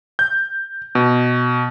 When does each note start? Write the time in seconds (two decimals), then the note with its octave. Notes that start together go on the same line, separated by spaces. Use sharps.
0.19 G6
0.95 B2